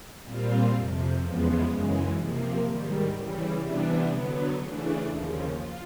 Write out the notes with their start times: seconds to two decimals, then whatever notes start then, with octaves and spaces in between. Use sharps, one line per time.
0.24 A#2 G3 C4 F4
0.72 F2 C3 F3
1.21 E2 C#3 F3 G#3 B3
1.69 F#2 C#3 E3 G#3
2.18 C3 F3 A#3
2.65 G#2 D#3 G3
3.14 C#3 E3 G3
3.62 C3 E3 G3 B3 D4
4.11 D3 F#3 B3
4.58 C#3 E3 A3 D4
5.06 D#2 C#3 F3
5.55 F4